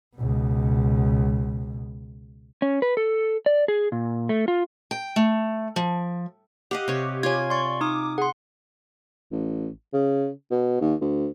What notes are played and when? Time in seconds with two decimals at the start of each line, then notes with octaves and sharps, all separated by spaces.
0.16 C#2 B2
2.62 C#4
2.82 B4
2.97 A4
3.46 D5
3.68 G#4
3.92 A#2
4.29 A3
4.48 F4
4.91 G5
5.16 A3
5.76 F3
6.71 G4 D#5 F5 F#5
6.88 C3 C#5
7.23 F4 C#5 G#5 G#6
7.50 D5 C6 C#6
7.81 D#4 D6 D#6
8.18 G#4 F#5 C6
9.32 A1
9.94 C#3
10.51 B2
10.81 D#2
11.01 D2